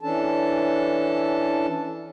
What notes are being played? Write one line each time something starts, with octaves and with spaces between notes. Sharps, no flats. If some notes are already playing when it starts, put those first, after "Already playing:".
E3 C#4 D4 A4 A5